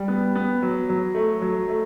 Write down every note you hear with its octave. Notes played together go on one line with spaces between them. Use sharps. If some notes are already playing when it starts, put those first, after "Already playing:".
Already playing: G3
B3
B3
F#3
F#3
A3
F#3
A3